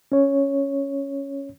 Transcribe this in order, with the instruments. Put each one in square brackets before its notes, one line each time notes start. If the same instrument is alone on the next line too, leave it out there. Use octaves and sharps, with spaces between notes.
[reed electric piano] C#4 C#5